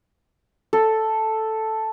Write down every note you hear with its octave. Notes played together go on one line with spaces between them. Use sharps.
A4